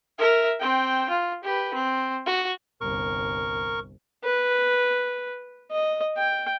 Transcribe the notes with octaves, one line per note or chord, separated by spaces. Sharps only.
A#4 E5
C4 G5
F4
G4 B4
C4
F#4
G1 C2 A#4 C#6
B4
D#5
G5